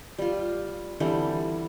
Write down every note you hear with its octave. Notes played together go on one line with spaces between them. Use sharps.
G3 F4
D3 E3 G3 C4